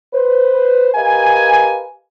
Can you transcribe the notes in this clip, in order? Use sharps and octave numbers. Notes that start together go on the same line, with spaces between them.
B4 C5
G4 A#4 B4 D#5 F5 G#5